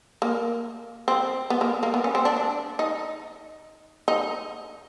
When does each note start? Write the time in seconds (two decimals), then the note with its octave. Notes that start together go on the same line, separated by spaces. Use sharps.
0.22 A#3
1.08 C4
1.50 B3
1.61 A#3
1.83 A#3
1.94 B3
2.04 C#4
2.15 C4
2.25 D4
2.37 D4
2.79 D#4
4.08 D#4